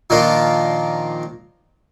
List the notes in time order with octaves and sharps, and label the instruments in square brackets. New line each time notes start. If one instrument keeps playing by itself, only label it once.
[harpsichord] A#2 D#3 F3 A#3 D4 F4